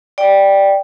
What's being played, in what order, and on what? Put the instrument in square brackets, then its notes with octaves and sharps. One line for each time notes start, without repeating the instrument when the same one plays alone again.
[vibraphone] D5 G5